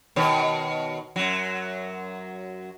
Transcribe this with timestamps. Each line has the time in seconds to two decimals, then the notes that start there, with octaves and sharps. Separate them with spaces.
0.16 B2 D#3 C#5
1.16 F#2 F#3